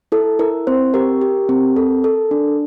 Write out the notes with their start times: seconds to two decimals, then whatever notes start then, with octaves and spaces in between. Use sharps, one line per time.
0.12 E4 A4
0.39 E4 A#4
0.67 C4 C5
0.94 G4 A#4
1.21 G4
1.49 C4
1.76 A4
2.04 A4
2.31 D4